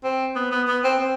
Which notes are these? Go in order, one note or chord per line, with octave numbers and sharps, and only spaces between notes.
C4
B3
B3
B3
C4
C4